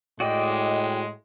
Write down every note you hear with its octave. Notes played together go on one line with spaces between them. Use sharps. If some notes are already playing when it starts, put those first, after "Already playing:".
A2 G#3 F#4 D5 D#5 G5